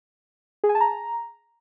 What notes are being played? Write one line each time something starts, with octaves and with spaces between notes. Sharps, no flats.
G#4
G#5
A5
A#5